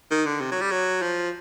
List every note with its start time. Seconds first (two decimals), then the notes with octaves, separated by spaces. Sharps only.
0.11 D#3
0.26 D3
0.41 C3
0.52 F#3
0.62 G3
0.71 F#3
1.02 F3